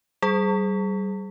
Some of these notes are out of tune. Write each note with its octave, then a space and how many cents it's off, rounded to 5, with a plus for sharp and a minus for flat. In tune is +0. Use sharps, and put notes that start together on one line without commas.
G3 -25 G#4 +15